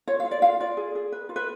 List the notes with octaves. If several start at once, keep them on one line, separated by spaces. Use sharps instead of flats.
F4 C#5
F5
F4
D5
F4 F5
F4 D5
G#4
G#4
B4
F4
B4